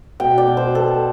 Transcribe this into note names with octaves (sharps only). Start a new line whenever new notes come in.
B2 G5
D5
B2
C5
B3 A4